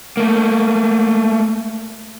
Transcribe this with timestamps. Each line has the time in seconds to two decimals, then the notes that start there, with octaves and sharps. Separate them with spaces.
0.17 A3 A#3